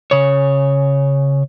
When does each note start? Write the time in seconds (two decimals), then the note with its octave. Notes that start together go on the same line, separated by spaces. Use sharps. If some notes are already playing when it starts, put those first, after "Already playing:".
0.11 C#3 C#5